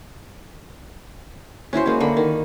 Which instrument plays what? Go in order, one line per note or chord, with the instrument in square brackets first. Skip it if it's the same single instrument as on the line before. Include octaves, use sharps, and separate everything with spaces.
[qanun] C#4 E4 F#4 C5
G#3 A#3 C#4
D3 A#3 F#4 B5
D#3